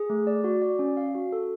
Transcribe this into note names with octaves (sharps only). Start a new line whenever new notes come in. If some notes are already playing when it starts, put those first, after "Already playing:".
Already playing: G#4
A3
D5
F#4
D5
C#4
F5
F#4
A4